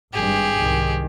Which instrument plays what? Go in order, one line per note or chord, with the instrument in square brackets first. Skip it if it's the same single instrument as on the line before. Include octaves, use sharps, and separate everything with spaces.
[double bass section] G#1 G2 [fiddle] G4 G#4
[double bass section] C2 G#2 D#3